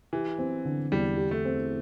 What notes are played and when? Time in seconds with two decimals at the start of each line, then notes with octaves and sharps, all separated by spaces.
0.13 E3 G4
0.39 C4
0.65 D3
0.92 E2 G3
1.18 G4
1.31 A3
1.45 C4